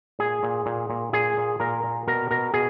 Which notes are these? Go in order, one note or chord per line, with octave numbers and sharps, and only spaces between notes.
A#2 G#4
A#2
A#2
A#2
A#2 G#4
A#2
A#2 A#4
A#2
B2 A#4
B2 A#4
B2 G#4